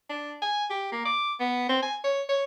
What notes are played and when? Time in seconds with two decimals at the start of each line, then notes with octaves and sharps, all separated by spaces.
0.09 D4
0.42 G#5
0.70 G4
0.92 A#3
1.05 D6
1.40 B3
1.69 C4
1.82 G#5
2.04 C#5
2.29 C#5